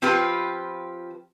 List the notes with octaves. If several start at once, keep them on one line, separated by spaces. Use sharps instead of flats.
F3 C4 F4 G4 B4